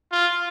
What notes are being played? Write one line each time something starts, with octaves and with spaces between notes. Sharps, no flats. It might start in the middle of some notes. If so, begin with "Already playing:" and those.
F4